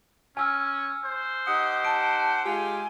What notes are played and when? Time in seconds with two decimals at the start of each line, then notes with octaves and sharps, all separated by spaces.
0.37 C#4 G#5 E6 F6
1.05 C5
1.47 D#4 G4 F#5 D#6
1.85 A5 D7
2.45 G#3 F4 G4 G#5